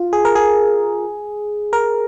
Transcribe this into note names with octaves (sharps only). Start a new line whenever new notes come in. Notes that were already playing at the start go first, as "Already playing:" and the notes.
Already playing: F4
G#4
A#4
G#4
A#4